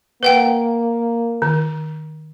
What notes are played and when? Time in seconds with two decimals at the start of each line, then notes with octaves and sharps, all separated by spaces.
0.23 A#3 B4 F#5 G5
1.42 D#3